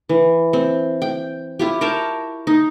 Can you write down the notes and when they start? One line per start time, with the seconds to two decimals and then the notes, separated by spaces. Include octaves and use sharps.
0.09 E3
0.53 C4
1.02 G5
1.59 E4 F4 G4
1.81 A#4 C#5 G5 A5
2.47 D#4